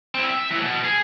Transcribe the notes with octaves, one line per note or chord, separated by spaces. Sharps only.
C4 E4
E5
A2 E3
B2
G#4